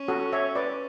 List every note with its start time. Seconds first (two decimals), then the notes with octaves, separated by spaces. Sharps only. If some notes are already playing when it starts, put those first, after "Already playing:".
Already playing: C#4
0.08 F#4 A4
0.32 C#5 E5
0.55 B4 D5